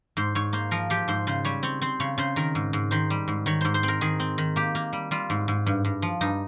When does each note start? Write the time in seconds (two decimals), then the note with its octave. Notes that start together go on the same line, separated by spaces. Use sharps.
0.17 G#2 C5
0.35 G#2 C#5
0.53 A#3 C5
0.71 F3 A#4
0.90 F3 G4
1.08 G#2 C5
1.27 C#3 C5
1.45 G3 C#5
1.63 C4 C#5
1.82 C4 C5
2.00 C#3 C#5
2.18 C#3 C5
2.36 D#3 A#4
2.55 G#2
2.73 G#2
2.91 D#3 C5
3.10 G3
3.28 G#2
3.46 D#3 C#5
3.61 G#2 C5
3.74 C5
3.83 C4
3.88 A#4
4.01 D#3 G#4
4.20 C4
4.38 D#3
4.56 A#3 G4
4.75 A#3
4.93 G3
5.11 G3 F4
5.30 G#2
5.48 G#2
5.66 G2
5.85 G2
6.02 F3
6.21 G2 D#4